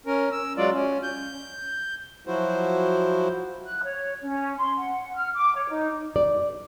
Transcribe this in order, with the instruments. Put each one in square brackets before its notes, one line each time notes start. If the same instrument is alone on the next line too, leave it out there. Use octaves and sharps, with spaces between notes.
[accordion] C#4 A#4
E6
F#3 G#3 F4 D5
C#4
G6
F3 F#3 E4 F#4 C5
[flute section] F#6
C#5
C#4
C6
F#5
F6
D6
C#5
D#4
[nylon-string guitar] D5